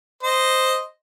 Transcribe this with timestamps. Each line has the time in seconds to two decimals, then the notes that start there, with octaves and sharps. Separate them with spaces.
0.23 C5 D#5